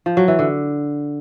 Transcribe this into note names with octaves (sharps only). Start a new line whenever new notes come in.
F3
F#3
E3
D3